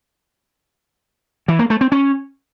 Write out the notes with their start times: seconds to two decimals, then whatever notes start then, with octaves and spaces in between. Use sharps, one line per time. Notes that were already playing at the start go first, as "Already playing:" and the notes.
1.48 E3
1.59 A#3
1.70 A3
1.81 C4
1.92 C#4